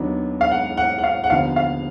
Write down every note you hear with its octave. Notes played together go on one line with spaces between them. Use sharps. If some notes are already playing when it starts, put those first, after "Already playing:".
Already playing: D#2 D#3 F#3 B3 D4
F5
F#5
F#5
F#5
F5
F#5
D#2 D3 F3 B3 F5
F5